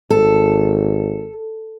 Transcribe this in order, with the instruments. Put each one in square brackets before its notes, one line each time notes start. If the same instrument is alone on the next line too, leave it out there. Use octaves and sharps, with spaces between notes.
[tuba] G#1 [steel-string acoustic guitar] A4